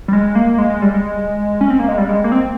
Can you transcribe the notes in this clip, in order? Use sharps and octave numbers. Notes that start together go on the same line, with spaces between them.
G3
G#3
A#3
G#3
G#3
G3
G#3
C#4
C4
A#3
G#3
G3
G#3
A#3
C4